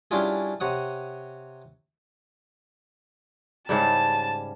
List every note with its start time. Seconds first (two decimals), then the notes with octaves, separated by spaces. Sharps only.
0.11 G3 C#4 D4 E4 F4 G#4
0.60 C3 C#5 F#5 D#6
3.69 G#2 C#3 G3 A5